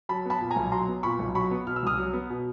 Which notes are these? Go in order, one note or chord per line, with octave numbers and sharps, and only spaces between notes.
F#3 A5 B5
B3 A5 B5
A#2
G#5 A#5
B1
F#3 A#5 C6
B3
A#2 B5 C#6
B1
F#3 B5 C#6
B3
B2 F6
E6
C2 D#6 F6
F#3
B3
B2